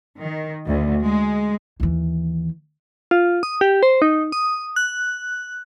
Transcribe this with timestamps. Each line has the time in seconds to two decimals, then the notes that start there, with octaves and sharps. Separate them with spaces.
0.18 D#3
0.68 D2
1.04 G#3
1.80 D#2 E3
3.11 F4
3.43 D#6
3.61 G4
3.83 C5
4.02 D#4
4.32 D#6
4.76 F#6